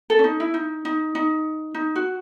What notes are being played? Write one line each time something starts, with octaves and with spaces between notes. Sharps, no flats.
A4
C#4
D#4
E4
D#4
D#4
D#4
D#4
F#4